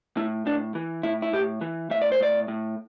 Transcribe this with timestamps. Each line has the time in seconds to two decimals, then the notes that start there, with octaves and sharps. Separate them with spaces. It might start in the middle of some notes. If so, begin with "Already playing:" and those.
0.17 A2 E4
0.46 A2 D4
0.75 E3
1.03 A2 E4
1.22 E4
1.33 A2 G4
1.61 E3
1.90 A2 E5
2.02 D5
2.12 C5
2.20 A2 D5
2.48 A2